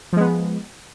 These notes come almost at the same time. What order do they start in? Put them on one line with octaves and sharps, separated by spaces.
F3 G#3 B3